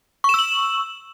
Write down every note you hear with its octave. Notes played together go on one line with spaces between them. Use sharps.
C#6 E6 E7 F#7